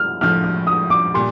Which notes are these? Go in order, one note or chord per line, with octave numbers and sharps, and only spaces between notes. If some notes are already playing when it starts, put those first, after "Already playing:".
Already playing: F6
A#1 A2 F3 F6
F6
D#6
D6
A#2 G3 C6